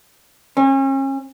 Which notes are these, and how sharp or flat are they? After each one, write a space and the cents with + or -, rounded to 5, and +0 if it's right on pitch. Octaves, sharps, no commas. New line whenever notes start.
C#4 -35